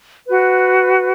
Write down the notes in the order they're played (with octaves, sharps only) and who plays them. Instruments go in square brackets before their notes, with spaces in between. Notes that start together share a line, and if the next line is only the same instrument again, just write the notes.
[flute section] F#4 B4